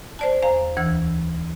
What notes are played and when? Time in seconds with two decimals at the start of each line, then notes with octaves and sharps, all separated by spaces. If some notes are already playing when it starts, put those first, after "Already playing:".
0.19 C5 D5 A5
0.42 E2 C5 F5 A#5
0.77 D2 E3 E6